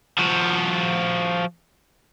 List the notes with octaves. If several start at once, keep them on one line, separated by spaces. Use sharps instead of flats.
F3 F#4